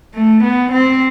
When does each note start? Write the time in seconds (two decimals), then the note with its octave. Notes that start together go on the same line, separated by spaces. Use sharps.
0.15 A3
0.43 B3
0.72 C4